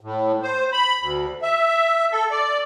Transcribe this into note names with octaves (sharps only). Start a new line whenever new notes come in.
A2
C5
B5
D2
E5
A4
D5